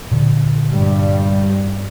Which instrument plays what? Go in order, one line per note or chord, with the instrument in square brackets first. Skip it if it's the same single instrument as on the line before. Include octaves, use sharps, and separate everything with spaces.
[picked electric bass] A#2 D3
[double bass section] G2 G3